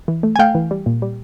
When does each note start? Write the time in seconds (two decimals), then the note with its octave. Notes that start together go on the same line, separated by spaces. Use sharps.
0.08 E3
0.23 A3
0.36 G#5
0.39 A3 F5 G5
0.55 E3
0.71 G3
0.86 A#2
1.02 G3